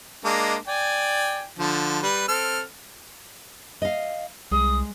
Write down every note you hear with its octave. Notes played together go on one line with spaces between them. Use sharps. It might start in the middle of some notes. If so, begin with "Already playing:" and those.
G#3 A#3 D4
D5 G5 G#5
D3 F3
G3 B4
C4 A4 F6
D#5 F5
C2 G#3 D#6